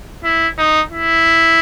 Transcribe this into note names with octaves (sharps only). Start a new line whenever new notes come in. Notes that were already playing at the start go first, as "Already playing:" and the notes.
E4
D#4
E4